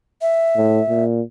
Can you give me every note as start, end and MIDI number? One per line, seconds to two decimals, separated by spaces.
0.22 1.04 76
0.56 0.80 45
0.89 1.21 46